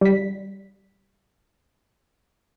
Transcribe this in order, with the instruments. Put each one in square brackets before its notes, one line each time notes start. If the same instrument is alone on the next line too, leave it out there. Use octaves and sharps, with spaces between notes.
[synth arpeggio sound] G3 B6